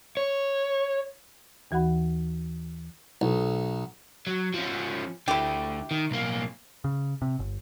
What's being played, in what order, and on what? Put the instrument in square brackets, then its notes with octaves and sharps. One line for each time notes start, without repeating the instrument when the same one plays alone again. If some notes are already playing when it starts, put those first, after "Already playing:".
[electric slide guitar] C#5
[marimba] D#2 E3 F#4 F#5 B5
[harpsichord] B1
[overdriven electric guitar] F#3
F3 C#4
[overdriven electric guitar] D2 D3 [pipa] E4 G4
[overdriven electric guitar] D#3
B1 A#3
[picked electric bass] C#3
C3
G1